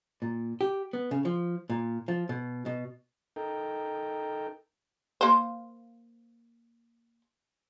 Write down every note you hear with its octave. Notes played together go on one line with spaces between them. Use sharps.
A#2
G4
B3
C#3
F3
A#2
F3
B2
B2
D#4 A4 A#4 G5
A#3 C5